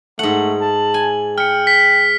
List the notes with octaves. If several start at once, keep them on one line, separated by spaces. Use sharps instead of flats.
G#2 A3 F#5 F#7
A5
G#5
G5 B5 F6 C#7
B6